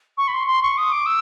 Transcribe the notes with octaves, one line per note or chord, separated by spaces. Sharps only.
C#6
B5
C6
C6
C#6
D#6
D6
E6